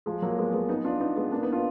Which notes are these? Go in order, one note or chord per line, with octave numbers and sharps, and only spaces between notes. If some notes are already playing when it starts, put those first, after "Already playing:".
F3 G#3
F#3 A#3
G#3 B3
G#3 B3
B3 D#4
D4 F4
B3 D#4
G#3 B3
A#3 D4
B3 D#4
D4 F4